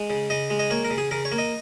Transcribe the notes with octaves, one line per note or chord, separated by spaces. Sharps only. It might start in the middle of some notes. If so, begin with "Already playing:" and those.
Already playing: G#3
C#3
C#3 D#5
G#3
D#5
A#3 C#5
A#4
C#3
G#4
C#3 A#4
C#5
A#3
D#5